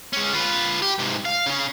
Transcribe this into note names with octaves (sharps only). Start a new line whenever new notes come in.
G#3 C#4
F4 B4
G4
G#2 C3
F5
C#3 C#4